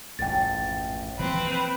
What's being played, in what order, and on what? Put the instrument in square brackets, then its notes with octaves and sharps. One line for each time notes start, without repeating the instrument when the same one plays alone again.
[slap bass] A1 F2 G#2 [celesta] G5 A6
[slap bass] E3 F3 A#3 [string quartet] C4 [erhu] B4